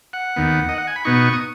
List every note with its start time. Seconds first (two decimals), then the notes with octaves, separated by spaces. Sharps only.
0.13 F#5
0.36 D#2 D#3 B3
0.69 D#5
0.78 F#5
0.87 G#5
0.96 B5
1.05 B2 B3 D#4 C#6
1.33 D#6